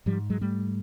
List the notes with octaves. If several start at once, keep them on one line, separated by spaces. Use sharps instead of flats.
G#2 F3 G3
F#3 G#3
G3 A3